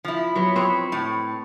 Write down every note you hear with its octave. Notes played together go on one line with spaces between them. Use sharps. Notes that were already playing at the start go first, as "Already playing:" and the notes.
F3 E4
F#3 B3
C4 B4 C#5
A2